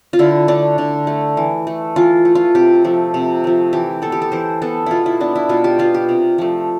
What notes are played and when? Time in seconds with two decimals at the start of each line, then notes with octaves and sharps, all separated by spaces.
0.13 F4
0.19 D3 E4
0.48 A3 D4
0.78 D3
1.07 A3
1.37 E3
1.67 A3
1.96 E3 F4
2.25 A3
2.35 F4
2.55 C3 G4
2.84 F3 A3
3.14 C3
3.44 F3 A3
3.73 E3 G4
4.02 B3 A4
4.12 G4
4.22 A4
4.32 E3 C5
4.62 B3 A4
4.86 B2 E4 F4
5.06 E4
5.20 B3 D4
5.36 E4
5.49 B2 F4
5.64 G4
5.79 B3 F4
5.94 G4
6.09 C3
6.38 F3 A3